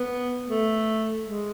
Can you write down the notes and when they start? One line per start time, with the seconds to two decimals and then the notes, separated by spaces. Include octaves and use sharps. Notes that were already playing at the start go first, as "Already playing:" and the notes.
Already playing: B3
0.48 A3
1.24 G#3